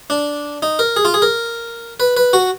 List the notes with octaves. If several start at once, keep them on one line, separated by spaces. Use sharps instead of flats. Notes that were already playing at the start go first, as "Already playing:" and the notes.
D4
D#4
A#4
G#4
F4
G#4
A#4
B4
B4
F#4